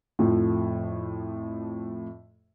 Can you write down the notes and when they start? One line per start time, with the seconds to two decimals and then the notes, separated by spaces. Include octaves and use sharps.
0.19 F2 A2 F3 A3